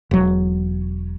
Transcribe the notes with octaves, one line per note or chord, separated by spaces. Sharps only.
E1 F#3